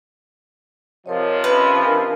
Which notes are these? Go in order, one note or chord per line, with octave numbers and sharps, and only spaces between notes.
C3 F3 A#4 C#5 D#5
C#4 B4 D#5 C6
D4 A#4 G#5